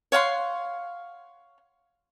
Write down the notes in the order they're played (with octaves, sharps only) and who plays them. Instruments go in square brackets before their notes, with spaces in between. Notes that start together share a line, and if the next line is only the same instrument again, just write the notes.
[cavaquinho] C#5 F5 F#5 C6